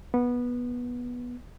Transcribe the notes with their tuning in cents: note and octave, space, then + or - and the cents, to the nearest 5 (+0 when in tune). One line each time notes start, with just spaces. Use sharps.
B3 -15